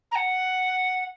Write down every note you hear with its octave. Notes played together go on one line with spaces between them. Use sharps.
A#5
F#5